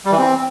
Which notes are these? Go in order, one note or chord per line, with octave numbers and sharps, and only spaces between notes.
G3
E3
C4